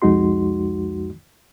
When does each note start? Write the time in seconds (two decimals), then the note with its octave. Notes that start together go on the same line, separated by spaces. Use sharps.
0.02 C2 F2 G#3 D#4 F#4 C6